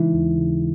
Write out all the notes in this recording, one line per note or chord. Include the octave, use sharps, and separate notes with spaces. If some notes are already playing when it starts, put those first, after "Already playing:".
Already playing: C#3 E3 G#3 D#4
D#2
C#3